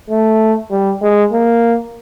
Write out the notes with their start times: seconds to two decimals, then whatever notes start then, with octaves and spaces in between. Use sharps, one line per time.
0.10 A3
0.71 G3
1.02 G#3
1.32 A#3